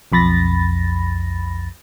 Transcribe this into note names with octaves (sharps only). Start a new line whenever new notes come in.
B1 F2 B5 A6 A#6